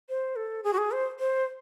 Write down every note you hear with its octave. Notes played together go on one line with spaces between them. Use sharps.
C5
A4
G#4
F#4
G#4
C5
C5